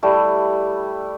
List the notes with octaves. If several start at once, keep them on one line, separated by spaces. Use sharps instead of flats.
G3 A3 E4